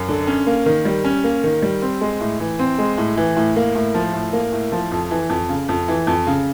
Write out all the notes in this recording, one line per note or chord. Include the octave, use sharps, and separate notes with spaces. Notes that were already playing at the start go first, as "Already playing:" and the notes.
Already playing: F#2
D3
C#4
A#3
D#3
G3
C#4
A#3
D#3
G3
C4
G#3
A2
E3
C4
G#3
A2
E3
A2
A#3
A2
F3
A2
A#3
A2
F3
F2
E3
F2
C#3
F2
E3
F2
C#3